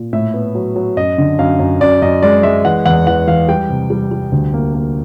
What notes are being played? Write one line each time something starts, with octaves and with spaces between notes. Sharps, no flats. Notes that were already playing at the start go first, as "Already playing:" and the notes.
Already playing: A#2
A2 E5
B3
F#3
F#3
F#2 D#5
D3
F#2 F5
F#2
F#2 D5
F#2 D#5
G#3 D5
G#3 E5
E3 F#5
E2 F#5
E3 F#5
E3 F5
G3 G5
C3
G3
G3
D2
A#3
A#3